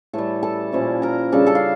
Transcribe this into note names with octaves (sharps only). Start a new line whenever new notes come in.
A2 E3 G3 A4 A5
A4 A5
A#2 F3 C#4 E4
A#4 A#5
C#3 G3 D4 A4 A5
A4 A5
F5